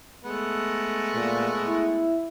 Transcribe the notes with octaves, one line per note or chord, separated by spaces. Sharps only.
G#3 A3 B3
A#2
E4